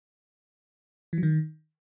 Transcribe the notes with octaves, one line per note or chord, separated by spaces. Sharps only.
E3
F#3
D#3